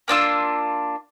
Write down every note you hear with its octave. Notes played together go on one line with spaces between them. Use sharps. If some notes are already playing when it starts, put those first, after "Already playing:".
A#3 D4 F4 E6